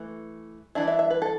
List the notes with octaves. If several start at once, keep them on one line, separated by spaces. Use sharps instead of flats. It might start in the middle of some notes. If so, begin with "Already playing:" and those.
Already playing: E3 A3
E3 D4 E5
E5
E5
B4
A4